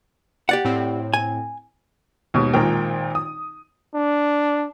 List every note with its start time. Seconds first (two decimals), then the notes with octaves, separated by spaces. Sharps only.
0.49 G4 D5 F#5
0.65 A2 C4
1.14 G#5
2.34 D#2 G#2 B2
2.53 G#1 A#2 D#3 A#4 G5
3.15 D#6
3.95 D4